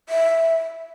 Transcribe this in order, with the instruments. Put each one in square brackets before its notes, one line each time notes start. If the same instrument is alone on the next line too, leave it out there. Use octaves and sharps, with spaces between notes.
[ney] E5